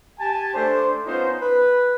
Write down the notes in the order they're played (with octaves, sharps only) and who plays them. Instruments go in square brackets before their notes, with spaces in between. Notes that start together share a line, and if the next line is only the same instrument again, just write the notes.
[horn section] G4 G#5 A5
A3 D4 C5
B3 C#4 D#4 F4 C5
B4